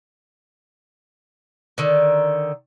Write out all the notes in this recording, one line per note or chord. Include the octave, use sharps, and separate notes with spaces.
D3 D#3